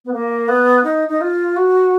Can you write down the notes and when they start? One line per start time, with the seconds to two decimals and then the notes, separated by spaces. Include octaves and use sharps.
0.05 B3
0.12 A#3
0.48 B3
0.83 D#4
1.08 D#4
1.21 F4
1.56 F#4